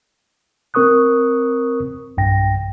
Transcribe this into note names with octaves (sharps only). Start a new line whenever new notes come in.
C4 A#4 C#6 D#6 F#6
B1 G2 G5 A#6